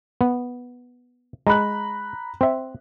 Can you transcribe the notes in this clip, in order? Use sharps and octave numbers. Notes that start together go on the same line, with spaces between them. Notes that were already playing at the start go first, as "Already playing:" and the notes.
B3
G#3 A#5 B5 F#6
C4 E5